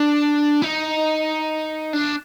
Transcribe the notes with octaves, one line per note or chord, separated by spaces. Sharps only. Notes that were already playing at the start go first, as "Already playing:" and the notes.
Already playing: D4
D#4
D4